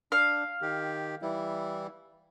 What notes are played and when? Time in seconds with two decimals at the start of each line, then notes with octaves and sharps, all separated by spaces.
0.12 D4 F5
0.62 D#3 G4
1.22 E3 G3 E4